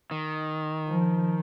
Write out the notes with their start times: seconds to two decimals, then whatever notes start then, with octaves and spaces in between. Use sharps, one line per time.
0.11 D#3
0.87 F3